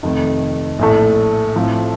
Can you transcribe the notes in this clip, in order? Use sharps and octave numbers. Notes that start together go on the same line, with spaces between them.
F1 F2 C3 D#3 A3
A#1 A2 A3
A2 F3 A3 C4